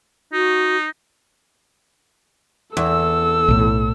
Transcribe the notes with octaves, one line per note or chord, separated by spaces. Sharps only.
D#4 F#4
E2 A4 E6
B1 A2